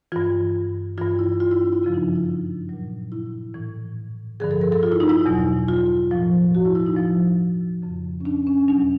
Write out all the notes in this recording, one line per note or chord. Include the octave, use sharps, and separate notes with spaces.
G2 E3 F4
G2 E3 F4
E4
F4
E4
D4
E4
F#2 C#3 F3 F4
D#4
D4
E4
A#2 F#3
E4
A2 E3
G2 D3 F3 G#4
A4
A#4
A4
F4
E4
D#4
E4
E2 B2 F#3
F4
A2 F3
F#4
E4
E4
D#4
A2 F3
F2 C#3 F3
C#4
D4
C#4
E2 B2 F#3 D4